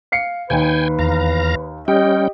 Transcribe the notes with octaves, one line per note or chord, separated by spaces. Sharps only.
F5 C7 C#7
D#2 D#4 B4 G5 G#5
E2 F5 A#5
G3 C#4 G4 D#5 G5